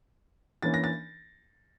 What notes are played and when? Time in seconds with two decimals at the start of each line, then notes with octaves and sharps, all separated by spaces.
0.63 E3 A#3 C#4 A6
0.74 A#6
0.84 A6